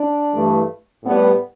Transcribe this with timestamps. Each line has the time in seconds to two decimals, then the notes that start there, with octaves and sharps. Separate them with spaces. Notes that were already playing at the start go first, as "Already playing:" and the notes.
Already playing: D4
0.35 G2 E3 A3
1.04 A2 G3 B3